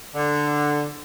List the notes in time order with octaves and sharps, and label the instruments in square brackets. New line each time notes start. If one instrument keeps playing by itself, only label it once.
[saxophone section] D3